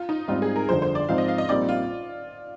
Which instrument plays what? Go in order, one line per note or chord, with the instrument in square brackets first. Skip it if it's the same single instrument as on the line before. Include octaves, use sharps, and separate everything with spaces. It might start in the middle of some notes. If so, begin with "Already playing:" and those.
Already playing: [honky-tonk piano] F4
D#4
[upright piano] G#2 G3 C4 D#4 [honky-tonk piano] F4
[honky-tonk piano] G#4
A#4
[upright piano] G1 F2 D3 [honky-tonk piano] C5
[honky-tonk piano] C5
D5
[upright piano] G#2 F3 C4 D#4 [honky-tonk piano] F5
[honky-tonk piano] D#5
F5
D#5
[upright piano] A#1 A#2 G3 C4 D#4 [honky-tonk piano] D5
[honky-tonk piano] F4